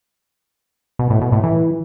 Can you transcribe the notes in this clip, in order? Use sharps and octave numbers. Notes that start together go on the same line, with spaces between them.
B2
A2
B2
A2
E3